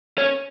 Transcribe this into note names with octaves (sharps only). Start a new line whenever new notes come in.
C#4